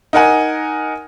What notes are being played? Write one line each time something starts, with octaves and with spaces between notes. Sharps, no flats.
D#4 A#4 F#5 G#5